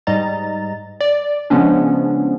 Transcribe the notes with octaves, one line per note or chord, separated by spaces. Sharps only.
G#2 G3 D#5 A#5 A6
D5
C#3 F3 G#3 B3 C#4 D4